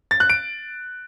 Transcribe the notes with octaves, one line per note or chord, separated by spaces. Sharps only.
A6
F#6
D7